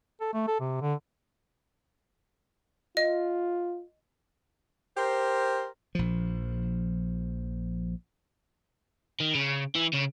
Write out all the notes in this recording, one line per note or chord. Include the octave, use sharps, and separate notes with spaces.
A4
A3
A4
C3
D3
F4 D#5
G4 A#4 C5
A#1 F3
D#3
C#3
E3
C#3